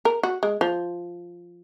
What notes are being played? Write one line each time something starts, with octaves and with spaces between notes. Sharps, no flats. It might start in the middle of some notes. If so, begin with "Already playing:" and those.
A#4
F#4
G#3
F3